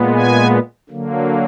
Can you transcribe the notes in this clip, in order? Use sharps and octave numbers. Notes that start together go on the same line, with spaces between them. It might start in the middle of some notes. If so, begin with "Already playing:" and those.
Already playing: A#2 G#3 B3
G#5
D3 F#3 A#3